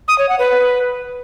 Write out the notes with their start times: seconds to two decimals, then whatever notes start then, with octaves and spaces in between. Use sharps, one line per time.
0.08 D#6
0.18 C#5
0.29 F#5
0.39 B4